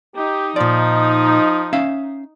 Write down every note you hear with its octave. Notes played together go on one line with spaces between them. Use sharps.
D#4 G4
A#2 F3 D5
C#4 E5 F5